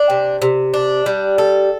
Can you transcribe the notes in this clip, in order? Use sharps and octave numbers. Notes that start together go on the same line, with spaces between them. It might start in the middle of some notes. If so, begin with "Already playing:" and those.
Already playing: D4
C3
C3
D4
G3
A4